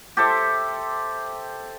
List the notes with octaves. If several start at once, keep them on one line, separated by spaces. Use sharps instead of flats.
G4 A4 C5 E5